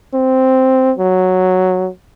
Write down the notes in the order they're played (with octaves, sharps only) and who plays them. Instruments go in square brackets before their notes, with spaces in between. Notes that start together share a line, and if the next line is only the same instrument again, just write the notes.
[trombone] C4
F#3